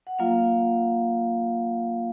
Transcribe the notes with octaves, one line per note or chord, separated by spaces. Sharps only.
F#5
F#3 A#3 F4 F5